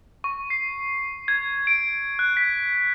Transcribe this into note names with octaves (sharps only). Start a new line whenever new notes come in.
C#6
C7
G#6
D7
F#6
B6